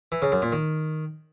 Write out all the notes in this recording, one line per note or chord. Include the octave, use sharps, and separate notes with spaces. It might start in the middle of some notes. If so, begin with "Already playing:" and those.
E3
C#3
F#2
A#2
D#3